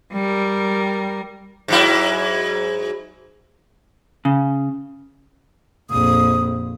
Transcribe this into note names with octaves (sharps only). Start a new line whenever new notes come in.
G3 A#4
G#2 F#3 E4
C#3
A#1 F2 D#6